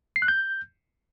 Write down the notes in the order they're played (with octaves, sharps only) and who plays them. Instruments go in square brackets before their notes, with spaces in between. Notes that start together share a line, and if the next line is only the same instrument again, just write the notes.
[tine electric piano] C7
F#6
G6